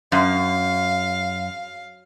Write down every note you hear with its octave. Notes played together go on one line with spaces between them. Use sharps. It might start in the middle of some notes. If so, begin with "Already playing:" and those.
F#2 F5